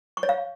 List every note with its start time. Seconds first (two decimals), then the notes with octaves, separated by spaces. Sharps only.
0.17 C#6
0.23 C#5
0.29 F5